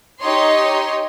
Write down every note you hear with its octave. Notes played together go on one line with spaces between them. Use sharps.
D#4 G4 C#5 D#5 C6